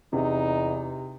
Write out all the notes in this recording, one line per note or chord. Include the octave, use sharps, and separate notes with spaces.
E2 C3 D#4